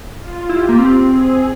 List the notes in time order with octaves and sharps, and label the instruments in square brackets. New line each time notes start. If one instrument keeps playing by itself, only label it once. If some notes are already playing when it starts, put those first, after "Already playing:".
[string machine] F4
[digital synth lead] E4 [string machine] G4
[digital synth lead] A#3
C4
[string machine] G#4